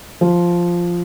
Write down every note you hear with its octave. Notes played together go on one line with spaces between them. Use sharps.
F3